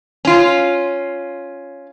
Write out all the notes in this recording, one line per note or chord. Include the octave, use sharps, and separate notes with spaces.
C#4 F4